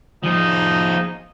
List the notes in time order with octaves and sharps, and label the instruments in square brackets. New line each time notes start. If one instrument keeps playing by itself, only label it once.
[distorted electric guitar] F3 G#4 [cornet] D#4